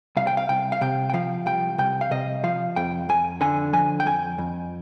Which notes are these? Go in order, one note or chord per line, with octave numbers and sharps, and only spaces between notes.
C2 F5
G5
F5
C2 G5
F5
C3 G5
G5
F3 F5
C2 G5
C2 G5
F5
C3 D#5
F3 F5
F2 G5
F2 G#5
D3 G#5
F3 G#5
G5
F2 G#5
F2